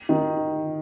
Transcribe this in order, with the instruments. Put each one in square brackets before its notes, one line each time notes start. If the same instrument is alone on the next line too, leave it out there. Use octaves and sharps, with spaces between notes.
[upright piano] D#3